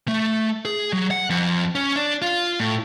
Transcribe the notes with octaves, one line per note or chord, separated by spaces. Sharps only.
A3
G#4
F#3
F#5
F2
C#4
D4
F4
A2